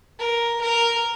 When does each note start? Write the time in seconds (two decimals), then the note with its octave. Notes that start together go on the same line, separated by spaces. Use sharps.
0.20 A#4
0.61 A#4